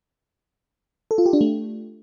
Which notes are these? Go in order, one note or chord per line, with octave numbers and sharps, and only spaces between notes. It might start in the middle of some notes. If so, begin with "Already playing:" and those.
A4
F4
G4
D4
A3